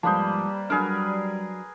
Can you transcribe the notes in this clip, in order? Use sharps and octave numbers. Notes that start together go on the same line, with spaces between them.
G#2 F3 G3 A#3 B4 C5 A5 D#6
F#3 D4 G#4 A#4 B4 F6